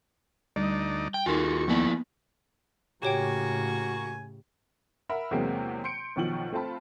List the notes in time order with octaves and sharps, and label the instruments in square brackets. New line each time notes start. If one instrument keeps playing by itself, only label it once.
[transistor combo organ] D2 D#4 D5 [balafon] G3
[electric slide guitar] G5
[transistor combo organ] D#2 C#6 [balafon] D#4 A#4 G#5 [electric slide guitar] F4 F#4 G#4
[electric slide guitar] F3 E4 D5 [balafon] A#3 B3
[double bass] A2 C#3 [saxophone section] A#3 F#4 [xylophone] G4 C#5 G5 [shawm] G#5
[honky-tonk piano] A#4 E5 F#5 B5
E2 C3 F#3 G#3 A#3 C4
C6 G6 C#7 D7
B1 B2 D#3 F3 F#7
A3 C4 F4 A5 B5